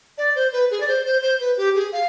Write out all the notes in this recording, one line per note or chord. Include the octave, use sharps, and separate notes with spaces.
D5
C5
B4
G#4
D5
C5
C5
C5
B4
G4
G#4
F5